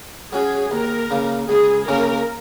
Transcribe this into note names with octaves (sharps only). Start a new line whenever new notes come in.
F#3 C#4 F#4 G#4
D#2 A#4
C#3 A#3
C#2 G#4
C#3 A#3 C#4 A#4